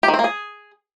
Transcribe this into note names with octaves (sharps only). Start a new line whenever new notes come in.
G4
D#3
C4
A#3
G#4